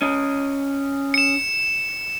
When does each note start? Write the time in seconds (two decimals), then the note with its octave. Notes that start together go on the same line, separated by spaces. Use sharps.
0.02 C#4 D#5
1.14 C#7 E7